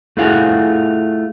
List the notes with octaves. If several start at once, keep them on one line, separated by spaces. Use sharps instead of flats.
A3 E4 F4 G#4 F5 F#5